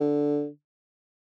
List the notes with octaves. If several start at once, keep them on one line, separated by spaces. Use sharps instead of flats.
D3